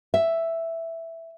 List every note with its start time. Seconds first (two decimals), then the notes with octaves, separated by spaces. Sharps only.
0.14 E5